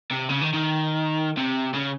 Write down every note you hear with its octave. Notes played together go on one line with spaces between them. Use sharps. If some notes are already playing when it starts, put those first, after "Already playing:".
C3
C#3
D#3
D#3
C3
C#3